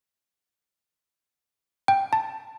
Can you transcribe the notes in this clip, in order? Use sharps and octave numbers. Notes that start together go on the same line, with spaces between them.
G5
A5